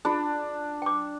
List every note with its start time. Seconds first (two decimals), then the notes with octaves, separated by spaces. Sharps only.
0.05 D4 F4 G#4
0.82 G5 D6